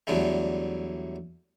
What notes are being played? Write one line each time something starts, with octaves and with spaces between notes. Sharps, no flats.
E2 D3 F#3 G3 A3